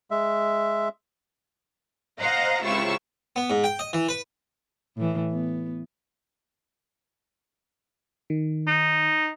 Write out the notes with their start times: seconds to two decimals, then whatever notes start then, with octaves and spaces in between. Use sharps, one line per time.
0.11 G#3 E5
2.18 C5 D#5 F5 F#5 A#5 A#6
2.64 C#2 C3 E4 F4 C#6 E6
3.36 B3
3.50 G#2
3.64 G5
3.79 D#5
3.93 E3
4.09 B4
4.97 A2 E3
5.31 B3
8.30 D#3
8.67 D#4